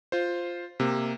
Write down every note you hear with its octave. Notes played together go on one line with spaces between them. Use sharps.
F4 C5
C3 A#3